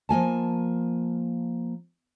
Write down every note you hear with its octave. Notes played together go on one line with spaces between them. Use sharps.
F3 A#3 G#5 A5